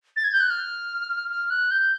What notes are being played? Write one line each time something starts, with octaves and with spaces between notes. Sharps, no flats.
A6
G#6
G6
F#6
F6
F6
F#6
G6